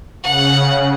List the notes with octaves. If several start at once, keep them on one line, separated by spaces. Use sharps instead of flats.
C#3 F#5